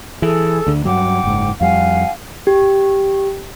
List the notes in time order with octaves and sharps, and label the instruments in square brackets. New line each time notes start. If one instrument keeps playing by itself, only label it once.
[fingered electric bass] E3 [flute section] G#4 A4
[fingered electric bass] D2 D3
[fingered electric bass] G2 F#3 [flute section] F#5 G5 D6
[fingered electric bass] F#1 G#2
[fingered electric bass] F2 G3 [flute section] F5 F#5 G#5
[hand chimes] G4